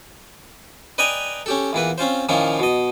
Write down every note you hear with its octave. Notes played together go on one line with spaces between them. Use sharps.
B4 D5 D#5 G5 G#5 A#5
C#4 G4 A4
E2 A#2 E4 B4
C4 C#4 F4 C5
A#2 D#3 F3 C#4 E4 F4
B2 D#5